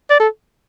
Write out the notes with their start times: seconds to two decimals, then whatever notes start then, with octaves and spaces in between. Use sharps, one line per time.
0.10 D5
0.20 A4